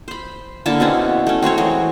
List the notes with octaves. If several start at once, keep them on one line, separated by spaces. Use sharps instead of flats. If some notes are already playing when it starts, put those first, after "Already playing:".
C5 B5
D3 A#3 E4 A5
B2 C4 C#4 F#5
A3 C#4
C4 F#4 C5 C#5
E3 F#3 G#3 C4